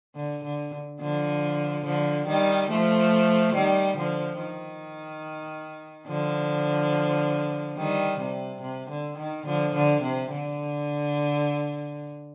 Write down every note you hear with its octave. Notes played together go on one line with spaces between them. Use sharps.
D3
D3
D3 F3
D3 F3
D#3 G3
F3 A3
D#3 G3
D3 F3
D#3
D3 F3
D#3 G3
C3
C3
D3
D#3
D3 F3
D3
C3
D3